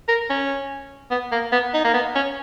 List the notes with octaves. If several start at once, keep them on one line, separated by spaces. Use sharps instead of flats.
A#4
C#4
B3
A#3
B3
D#4
A#3
B3
C#4